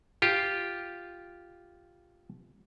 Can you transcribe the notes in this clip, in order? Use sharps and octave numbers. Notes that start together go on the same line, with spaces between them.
F4 G4